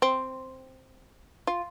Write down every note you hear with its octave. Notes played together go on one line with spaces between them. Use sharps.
C4
F4